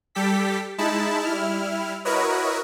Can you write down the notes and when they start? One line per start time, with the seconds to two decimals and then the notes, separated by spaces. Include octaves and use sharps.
0.15 G3 G4 A4 B6
0.78 G#3 D#4 E4 A5 B5
1.25 G3 E4 F6
2.05 E4 F#4 A#4 B4 C#5 D#5